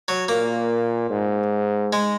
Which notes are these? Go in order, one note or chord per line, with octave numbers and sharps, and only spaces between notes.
F#3
A#2 A#3
G#2
G#3